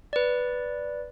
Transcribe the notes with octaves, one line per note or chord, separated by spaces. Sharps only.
B4 D5